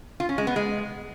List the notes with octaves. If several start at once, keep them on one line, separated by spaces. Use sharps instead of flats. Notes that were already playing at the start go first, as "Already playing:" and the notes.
F4
C#4
G#3
B3
G#3